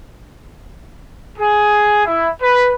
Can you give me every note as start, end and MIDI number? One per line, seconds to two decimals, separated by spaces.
1.39 2.03 68
2.05 2.29 64
2.41 2.73 71